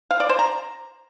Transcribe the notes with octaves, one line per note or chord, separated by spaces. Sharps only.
F5
D5
C5
A#5